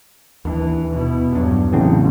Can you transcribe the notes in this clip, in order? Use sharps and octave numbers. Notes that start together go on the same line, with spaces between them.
D#2 E3 D4
B2 E4
E2 G2 F#3 D4
A1 C#3 E3 B3 C4 D4